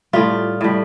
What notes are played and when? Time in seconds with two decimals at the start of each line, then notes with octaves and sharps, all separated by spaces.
0.13 A2 G3 F4
0.61 A2 G3